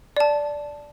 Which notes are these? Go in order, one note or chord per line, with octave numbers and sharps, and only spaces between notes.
D5 A5